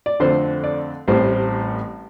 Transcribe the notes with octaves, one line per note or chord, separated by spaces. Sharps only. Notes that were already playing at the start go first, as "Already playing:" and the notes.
D5
F2 D3 A3 C4 C5
D5
A1 A2 G3 C4 C5